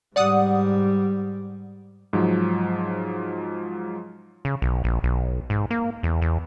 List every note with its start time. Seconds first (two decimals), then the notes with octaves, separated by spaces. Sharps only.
0.16 G#2 G3 D5 F#5 D#6
2.13 G#2 F3 F#3
4.45 C#3
4.62 B1
4.84 A#1
5.03 B1
5.50 G#2
5.71 A#3
6.03 E2
6.22 E2